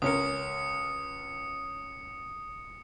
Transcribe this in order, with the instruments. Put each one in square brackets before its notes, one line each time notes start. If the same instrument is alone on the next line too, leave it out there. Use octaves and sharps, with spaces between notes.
[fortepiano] C#2 C#4 A#4 [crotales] D#6 C#7